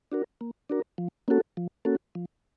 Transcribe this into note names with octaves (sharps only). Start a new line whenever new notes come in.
D4 F#4 A#4
A#3
D4 F#4 A#4
F3
A#3 C#4 F#4 A4
F3
A#3 C#4 F#4 A4
F3